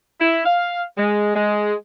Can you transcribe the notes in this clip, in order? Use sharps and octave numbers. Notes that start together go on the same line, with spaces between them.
E4
F5
G#3
G#3